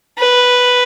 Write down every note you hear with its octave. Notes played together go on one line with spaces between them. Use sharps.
B4